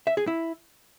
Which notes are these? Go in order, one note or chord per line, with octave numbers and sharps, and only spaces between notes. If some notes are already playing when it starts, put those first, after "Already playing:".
E5
G#4
E4